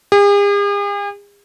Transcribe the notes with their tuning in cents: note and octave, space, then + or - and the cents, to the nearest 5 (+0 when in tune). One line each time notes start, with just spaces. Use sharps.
G#4 -45